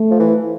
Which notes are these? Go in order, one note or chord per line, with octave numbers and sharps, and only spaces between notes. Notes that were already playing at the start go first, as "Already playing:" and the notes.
Already playing: A3
F3
E3